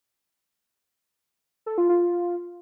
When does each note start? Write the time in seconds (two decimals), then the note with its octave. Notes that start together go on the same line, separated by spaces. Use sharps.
1.66 A4
1.78 F4
1.89 F4